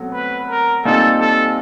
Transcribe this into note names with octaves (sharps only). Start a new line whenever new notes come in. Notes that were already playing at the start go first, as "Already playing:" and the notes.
Already playing: B2 F#3 A3 C4
B4
A#4
A#2 G3 C4 D#4 A4
A4